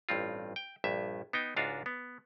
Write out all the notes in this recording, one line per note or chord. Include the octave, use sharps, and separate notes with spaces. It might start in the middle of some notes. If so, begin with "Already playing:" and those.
A1 G2 C4 F4
G5
A#1 G2 E5
B3 D#4 G5
C#2 G#2 D4 F4 F#4 F5
B3